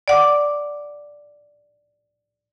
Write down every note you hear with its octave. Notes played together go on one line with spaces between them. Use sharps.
D5 F#5 D6